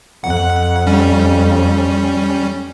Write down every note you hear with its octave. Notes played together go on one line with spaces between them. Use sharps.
F2 F#5
G3 C#4